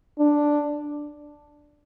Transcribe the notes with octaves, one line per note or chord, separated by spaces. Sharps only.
D4